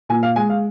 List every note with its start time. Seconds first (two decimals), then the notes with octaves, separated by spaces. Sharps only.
0.09 A#2 G#5
0.23 F5
0.36 G#3 G#5
0.50 F5